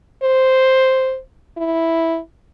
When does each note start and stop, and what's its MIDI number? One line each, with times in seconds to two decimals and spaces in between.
0.23 1.18 72
1.57 2.19 64